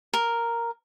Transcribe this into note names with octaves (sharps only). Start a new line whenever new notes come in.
A#4